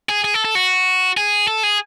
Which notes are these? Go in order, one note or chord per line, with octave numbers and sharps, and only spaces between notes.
G#4
G#4
A4
A4
F#4
G#4
A4
G#4